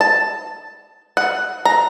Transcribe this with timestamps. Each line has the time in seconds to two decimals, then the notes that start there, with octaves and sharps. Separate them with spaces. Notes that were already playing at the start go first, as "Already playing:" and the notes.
0.01 A5
1.17 F#5
1.65 A#5